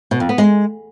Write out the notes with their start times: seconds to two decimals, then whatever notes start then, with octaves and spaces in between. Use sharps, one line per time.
0.11 B2
0.20 F2
0.29 B3
0.38 G#3